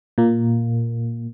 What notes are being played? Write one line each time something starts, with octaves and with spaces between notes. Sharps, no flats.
A#2 A#3